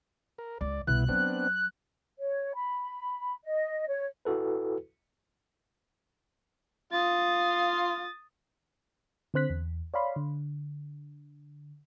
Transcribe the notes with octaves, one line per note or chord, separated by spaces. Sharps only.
A#4
C#2 D5
C2 B2 B3 E4 F#6
F#3 B3 C4 D4
C#5
B5
D#5
C#5
E4 F#4 A4 B4
F4 F5 D#6 A6
D3 C4 C5 F#6 B6
E2
C#5 D5 F5 B5 C6
D3